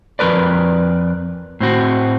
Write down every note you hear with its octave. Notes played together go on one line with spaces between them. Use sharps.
F2 A#3 A#4 B4 D5
A2 C4 F#4